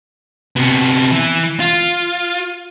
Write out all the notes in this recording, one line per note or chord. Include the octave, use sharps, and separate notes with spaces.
C3 B3
E3
F4